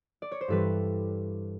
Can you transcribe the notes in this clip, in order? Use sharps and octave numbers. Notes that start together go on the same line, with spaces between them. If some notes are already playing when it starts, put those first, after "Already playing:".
D5
C#5
C5
G2 E3 G3 A4 B4